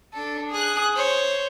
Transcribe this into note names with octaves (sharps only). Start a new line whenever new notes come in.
D4 A4
G#4 F#6
C5 C#5